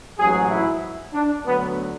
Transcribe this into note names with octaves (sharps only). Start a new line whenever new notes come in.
A1 G#2 F#3 G#4
E4
D4
D2 D3 F#3 B3